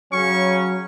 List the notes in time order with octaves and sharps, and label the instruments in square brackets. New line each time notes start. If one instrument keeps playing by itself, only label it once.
[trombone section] C#3 C#4 [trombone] F#3 [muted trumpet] C#6